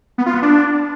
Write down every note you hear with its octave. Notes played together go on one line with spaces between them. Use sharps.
B3
F4
B3
D4